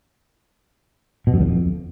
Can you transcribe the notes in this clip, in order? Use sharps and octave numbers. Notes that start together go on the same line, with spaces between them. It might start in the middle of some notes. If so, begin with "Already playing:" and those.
B2
F#2
E2
F2